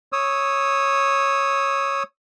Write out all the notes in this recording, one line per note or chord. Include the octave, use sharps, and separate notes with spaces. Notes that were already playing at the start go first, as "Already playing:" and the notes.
C#5 D#6 E6